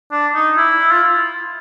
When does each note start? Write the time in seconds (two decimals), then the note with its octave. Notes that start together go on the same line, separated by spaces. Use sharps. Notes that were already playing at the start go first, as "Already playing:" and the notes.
0.12 D4
0.35 D#4
0.58 E4
0.92 F4